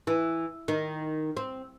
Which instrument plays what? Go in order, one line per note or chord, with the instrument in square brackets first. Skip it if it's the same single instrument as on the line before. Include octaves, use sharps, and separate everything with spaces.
[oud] E3
D#3
C4